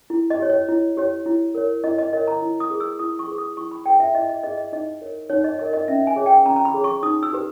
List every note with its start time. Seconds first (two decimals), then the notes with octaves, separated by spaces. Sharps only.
0.10 E4
0.30 D#5
0.39 G4 C#5
0.49 C#5
0.68 E4
0.97 G4 C#5
1.26 E4
1.55 A#4 C#5
1.84 E4 D#5
1.98 D#5
2.13 A#4 C#5 D#5
2.27 A#5
2.42 E4
2.60 D#6
2.70 G#4 B4
2.80 E6
2.99 E4 D#6
3.19 C#6
3.28 G#4 B4
3.38 D#6
3.57 E4 C#6
3.71 B5
3.86 G#4 B4 G5
4.00 E5
4.15 E4 D#5
4.29 D#5
4.43 G#4 B4 D#5
4.57 D#5
4.72 D#4 D#5
5.01 A#4 C#5
5.30 D#4 C#5
5.44 D#5
5.58 A#4 C#5 D#5
5.73 D#5
5.88 C#4 E5
6.07 G#5
6.16 G#4 C#5
6.26 G5
6.45 C#4 A#5
6.56 A#5
6.65 B5
6.74 G#4 C#5
6.84 C#6
7.03 D#4 D#6
7.23 E6
7.33 G4 B4